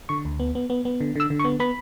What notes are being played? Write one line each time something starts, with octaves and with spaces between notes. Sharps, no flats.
D3 C#6
D2
B3
B3
B3
B3
D3
D3 E6
D3
C#6
B3
B3 B5